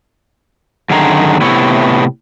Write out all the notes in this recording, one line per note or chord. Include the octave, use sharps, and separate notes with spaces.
F#2 D3 D#3 G#4 A#5
A2 C3 B3 E4 C#5